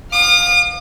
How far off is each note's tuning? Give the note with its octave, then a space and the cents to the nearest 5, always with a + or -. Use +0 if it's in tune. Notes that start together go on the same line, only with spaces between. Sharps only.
F5 +20 D#6 -40